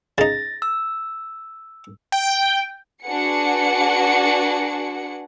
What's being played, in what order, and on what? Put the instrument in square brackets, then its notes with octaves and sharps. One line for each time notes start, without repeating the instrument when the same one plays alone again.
[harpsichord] C#3 D#4 [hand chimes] A6 A#6
[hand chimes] E6
[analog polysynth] G5
[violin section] D4 F#4 G#4 B4 F#5 C#7